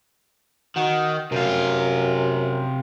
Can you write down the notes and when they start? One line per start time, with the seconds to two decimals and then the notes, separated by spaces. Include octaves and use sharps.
0.77 D#3 F#4
1.32 F#2 C3 F4